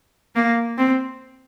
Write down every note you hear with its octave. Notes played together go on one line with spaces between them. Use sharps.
A#3
C4